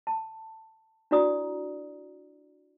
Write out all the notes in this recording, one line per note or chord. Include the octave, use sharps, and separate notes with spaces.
A5
D4 E4 F#4 D5 A#5 D#6